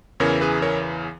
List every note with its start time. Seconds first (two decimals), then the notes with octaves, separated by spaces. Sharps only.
0.20 E2 C#3 E3 A#4 C#5
0.41 G#4 B4
0.62 A#4 C#5